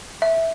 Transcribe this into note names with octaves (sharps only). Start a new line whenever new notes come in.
E5